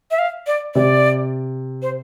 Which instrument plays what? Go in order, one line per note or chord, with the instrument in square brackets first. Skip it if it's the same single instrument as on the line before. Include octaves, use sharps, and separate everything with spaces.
[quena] E5
F5
D5
[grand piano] C3 [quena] D5
[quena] C5